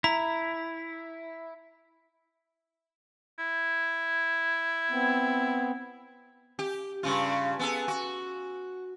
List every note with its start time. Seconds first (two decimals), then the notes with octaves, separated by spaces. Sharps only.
0.04 E4 A#5
3.39 E4
4.91 B3 C4
6.59 G4
7.03 G2 C#3 F4
7.59 B3 G#4 A4
7.88 F#4